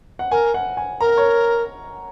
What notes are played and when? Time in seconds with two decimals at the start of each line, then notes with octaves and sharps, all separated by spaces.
0.19 F#5
0.31 A#4 G#5
0.54 F#5
0.77 G#5
1.01 A#4 A#5
1.17 C#5